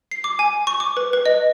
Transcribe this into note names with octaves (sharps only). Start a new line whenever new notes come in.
C7
D6
G#5
C#6
D6
B4
B4
D#5